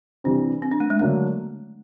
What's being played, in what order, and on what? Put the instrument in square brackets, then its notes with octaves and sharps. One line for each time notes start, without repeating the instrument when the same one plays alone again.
[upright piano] C3 E3 G3 C4 [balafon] D4
[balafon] C4
D4
A3
G#3
[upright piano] D3 F#3 A#3 D4 [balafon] A3